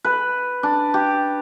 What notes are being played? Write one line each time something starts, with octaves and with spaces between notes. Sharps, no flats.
B4
D4
G4